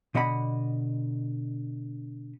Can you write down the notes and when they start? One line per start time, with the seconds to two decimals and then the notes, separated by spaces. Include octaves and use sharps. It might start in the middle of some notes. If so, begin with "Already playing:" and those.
0.15 B2 D3 D#5 F#5 B5